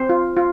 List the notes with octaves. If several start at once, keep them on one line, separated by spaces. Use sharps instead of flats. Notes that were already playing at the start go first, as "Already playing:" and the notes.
Already playing: C4 C5
F4
F4